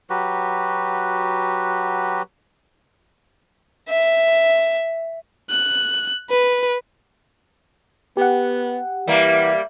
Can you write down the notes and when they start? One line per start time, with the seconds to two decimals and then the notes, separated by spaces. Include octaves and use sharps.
0.10 F#3 F#4 G4 B4
3.90 E5
5.50 F#6
6.30 B4
8.17 B3 G4 F#5
9.08 E3 G3 A#3 E5